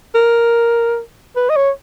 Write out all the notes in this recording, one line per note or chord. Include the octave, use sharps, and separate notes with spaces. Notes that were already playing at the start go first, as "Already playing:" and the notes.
A#4
B4
D#5
C#5